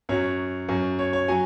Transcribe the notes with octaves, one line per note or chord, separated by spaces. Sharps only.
F#2 F#3 C#5
F#2 F#3
C#5
C#5
F#3 G#5